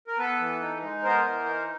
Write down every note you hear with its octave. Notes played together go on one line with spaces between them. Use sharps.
A#4
B3 A4 B4
E3
D#4
G#3
B3 A#4 C5
E3
D#4